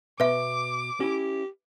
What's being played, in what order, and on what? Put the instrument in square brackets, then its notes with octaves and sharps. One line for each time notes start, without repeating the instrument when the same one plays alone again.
[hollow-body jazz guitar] B2 [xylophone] B4 E5 [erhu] D6
[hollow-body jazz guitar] C#4 E4 [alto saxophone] G4